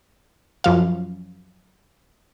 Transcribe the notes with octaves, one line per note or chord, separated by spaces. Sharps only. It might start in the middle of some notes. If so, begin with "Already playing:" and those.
F#2 F3 F5